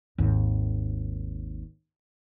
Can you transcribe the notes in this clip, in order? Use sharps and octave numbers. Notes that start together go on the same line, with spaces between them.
G#1 D#2